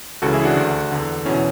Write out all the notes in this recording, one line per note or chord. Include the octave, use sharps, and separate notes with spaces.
C#2 C#3 E3 F#4 A4
E4 G#4
D4 F#4
D2 D3
E2 D3
E2 B2 C#4 E4